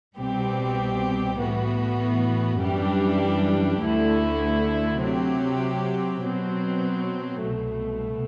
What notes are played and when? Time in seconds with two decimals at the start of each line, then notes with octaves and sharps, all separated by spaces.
0.18 C2 B2 G3 C4 G4
1.39 A2 E3 B3 F#4
2.59 F#2 E3 G3 D4 G4
3.80 D2 D3 A3 E4
5.00 C3 F#3 C4 G4
6.22 B2 F#3 C4
7.42 C2 B2 A3